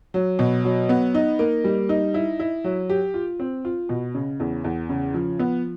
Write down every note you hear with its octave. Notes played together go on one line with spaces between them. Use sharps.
F#3
B2
F#3
B3
D#4
A#3
G3
D#4
E4
E4
F#3
G4
F4
C4
F4
B2
C#3
E2
E2
C#3
F3
B3